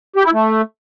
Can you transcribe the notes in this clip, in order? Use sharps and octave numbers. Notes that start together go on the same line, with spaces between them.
G4
E4
A3